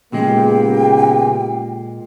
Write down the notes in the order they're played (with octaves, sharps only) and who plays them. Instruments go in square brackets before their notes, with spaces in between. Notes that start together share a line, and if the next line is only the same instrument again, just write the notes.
[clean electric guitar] A#2 G#3 [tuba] C#3 [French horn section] A#3 B3 G4 [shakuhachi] G5